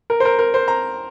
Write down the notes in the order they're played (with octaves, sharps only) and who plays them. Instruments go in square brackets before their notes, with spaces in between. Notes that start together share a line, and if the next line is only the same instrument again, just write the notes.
[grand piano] A#4
C5
A#4
A#4
C5
A#5